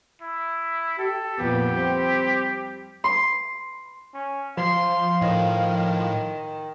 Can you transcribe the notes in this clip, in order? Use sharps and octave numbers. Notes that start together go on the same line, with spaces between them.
E4
G4 A4
F2 A#2 B3 G4
G3 C4
C6
C#4
F3 F5 C6
A2 D#3